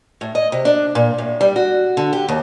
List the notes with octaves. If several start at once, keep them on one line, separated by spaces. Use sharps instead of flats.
A2
D#5
C3
D4
A#2
A2
G3
F#4
D3
G4
D#2